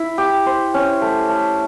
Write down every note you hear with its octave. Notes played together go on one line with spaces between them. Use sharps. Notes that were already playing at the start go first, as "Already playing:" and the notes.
Already playing: E4
G4
C5
C#4
A3
A3